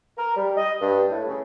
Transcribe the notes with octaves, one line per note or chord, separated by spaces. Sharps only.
A#4
G3
D#5
G2
A2
C#3